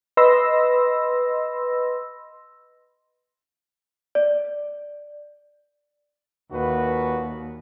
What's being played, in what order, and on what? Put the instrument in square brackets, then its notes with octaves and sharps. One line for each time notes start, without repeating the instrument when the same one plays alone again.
[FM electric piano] B4 D#5 B5 C6 E6 A#6
[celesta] D5
[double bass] D#2 [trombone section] A#2 F#4 B4